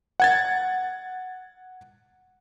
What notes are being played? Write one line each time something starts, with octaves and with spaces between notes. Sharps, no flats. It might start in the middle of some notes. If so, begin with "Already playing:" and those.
F#5 G#6 A6